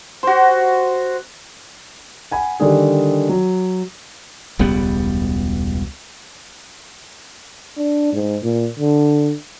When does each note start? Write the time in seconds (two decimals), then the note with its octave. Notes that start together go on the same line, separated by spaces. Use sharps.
0.23 F#4 C5
2.31 F#5 G#5 B5
2.60 D3 D#3 G3 D4 G#4
3.29 F#3
4.59 E1 C#2 G3 B3
7.77 D4
8.13 G#2
8.43 A#2
8.79 D3